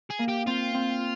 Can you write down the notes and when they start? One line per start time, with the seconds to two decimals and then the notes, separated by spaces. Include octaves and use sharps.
0.10 G#4
0.19 A#3
0.29 G4
0.47 C4 F4
0.74 C4